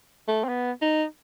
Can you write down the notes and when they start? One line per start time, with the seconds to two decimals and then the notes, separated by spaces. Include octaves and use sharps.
0.28 A3
0.44 C4
0.49 B3
0.82 D#4